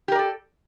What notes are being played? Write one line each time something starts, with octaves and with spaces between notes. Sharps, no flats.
G4 A4 A#4 D5